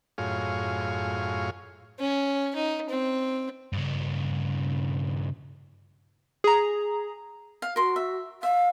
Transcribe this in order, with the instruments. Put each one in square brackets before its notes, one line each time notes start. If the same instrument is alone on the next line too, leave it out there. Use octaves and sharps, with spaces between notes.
[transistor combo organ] F#2 A2 F4 G#4 C#5 F5
[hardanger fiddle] C#4
D#4
C4
[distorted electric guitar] G2 C#3
[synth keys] G#4 A#5
[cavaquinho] F5
[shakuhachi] F#4 [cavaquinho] A#4 C6
[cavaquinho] E5
[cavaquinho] E5 [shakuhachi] F5